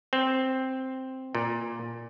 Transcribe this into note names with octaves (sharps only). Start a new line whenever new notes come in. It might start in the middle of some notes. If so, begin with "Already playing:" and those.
C4
A#2